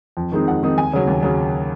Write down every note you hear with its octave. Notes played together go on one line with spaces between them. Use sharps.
F2
D#3 G#3 C4 D#4
F2 F#5
D#3 G#3 C4 D#4
D#2 G#5
C#3 F#3
D#2
C#3 F#3